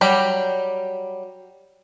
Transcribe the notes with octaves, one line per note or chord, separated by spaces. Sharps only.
F#3 G3 G4